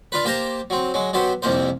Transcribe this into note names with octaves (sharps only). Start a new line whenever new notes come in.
D4 F4 B4
A#3 G4 C5 A5 A#5
F#3 C4
F#3 G#3
B2 F#3 G4 C5
C2 F2 C3 A#3 C5